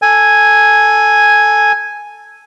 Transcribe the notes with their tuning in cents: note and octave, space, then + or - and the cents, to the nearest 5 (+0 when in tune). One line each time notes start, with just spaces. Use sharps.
A4 +0 G#5 +0